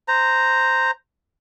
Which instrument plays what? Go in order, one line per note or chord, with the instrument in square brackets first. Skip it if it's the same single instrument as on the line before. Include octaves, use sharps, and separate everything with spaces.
[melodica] C5 A#5